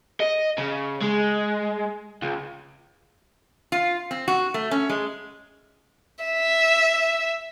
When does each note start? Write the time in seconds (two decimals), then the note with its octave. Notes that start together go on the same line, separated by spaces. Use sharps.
0.20 D#5
0.58 C#3
1.01 G#3
2.22 C#2
3.72 F4
4.11 C4
4.28 F#4
4.54 A3
4.71 C#4
4.89 G#3
6.24 E5